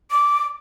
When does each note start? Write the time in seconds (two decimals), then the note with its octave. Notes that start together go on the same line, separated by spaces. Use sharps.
0.11 D6